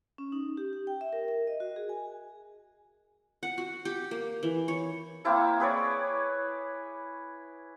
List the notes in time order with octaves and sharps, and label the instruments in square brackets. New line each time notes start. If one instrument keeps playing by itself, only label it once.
[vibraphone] C#4
D#4
G4
G4
G5
E5
A#4
A#4
D#5
F#4
G#4
G#5
[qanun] F#5
F#4
G4
A#3
E3
C#5
[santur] A#3 C4 E4 A4
G#4 B4 C#5 D5